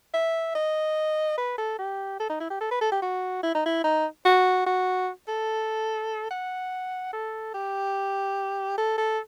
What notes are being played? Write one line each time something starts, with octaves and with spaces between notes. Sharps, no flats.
E5
D#5
B4
A4
G4
A4
D#4
E4
G4
A4
B4
A4
G4
F#4
E4
D#4
E4
D#4
F#4
F#4
A4
F#5
A4
G4
A4
A4